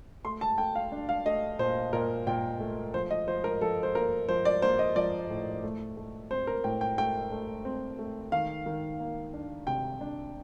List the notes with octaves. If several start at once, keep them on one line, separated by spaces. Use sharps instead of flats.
A3 C6
A5
A3 G5
F5
D4
F5
A3 D#5
A#2 C5
A#2 A#4
A#2 G5
A3
F3 C5
D#5
F3 C5
A#4
F3 A4
C5
A#3 A#4
F3 C5
D5
A#3 C5
D#5
F3 D5
A2
A3
A3
C4 C5
A#4
A2 G5
G5
A3 G5
A3
C4
A3
D#3 F5
D#3
A#3
D4
C3 G5
D4